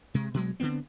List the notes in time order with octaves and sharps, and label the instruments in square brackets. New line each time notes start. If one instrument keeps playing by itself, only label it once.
[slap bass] C3 G#3
B2 F#3 G#3
D3 F#3 B3 C4